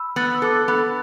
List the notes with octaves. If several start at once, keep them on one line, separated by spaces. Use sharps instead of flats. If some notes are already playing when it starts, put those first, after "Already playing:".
Already playing: B5 E6
B3 A6
F#6
E6
A4 D6 F#6
E6 A6
B3